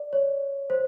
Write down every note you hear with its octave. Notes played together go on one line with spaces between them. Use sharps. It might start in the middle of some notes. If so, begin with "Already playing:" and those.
Already playing: D5
C#5
C5